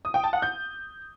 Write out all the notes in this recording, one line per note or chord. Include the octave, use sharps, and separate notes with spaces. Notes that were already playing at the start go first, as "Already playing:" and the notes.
D#6
G5
A5
F#5
G6